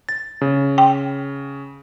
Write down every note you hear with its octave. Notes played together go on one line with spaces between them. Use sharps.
A6
C#3
G5